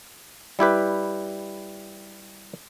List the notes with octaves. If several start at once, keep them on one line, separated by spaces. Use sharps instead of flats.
G3 E4 G4 B4